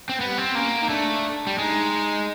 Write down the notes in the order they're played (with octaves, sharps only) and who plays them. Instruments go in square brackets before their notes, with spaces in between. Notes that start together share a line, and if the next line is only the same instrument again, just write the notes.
[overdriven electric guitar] C4
[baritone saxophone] G3 [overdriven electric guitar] B3
[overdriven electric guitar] C4
[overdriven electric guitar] A#3 [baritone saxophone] C#4
[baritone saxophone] D#4
[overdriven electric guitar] A3 [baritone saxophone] D4
[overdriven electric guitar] G3
[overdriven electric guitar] G#3 [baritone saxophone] D#4